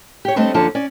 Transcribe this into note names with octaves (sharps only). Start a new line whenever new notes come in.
G4 C#5
G3 A3 C4 D4 A4 D#5
F#2 D3 F3 A#3 C#5 A5
C#4 D5